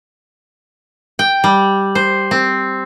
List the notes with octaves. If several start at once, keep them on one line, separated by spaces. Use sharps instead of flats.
G5
G3
C5
C4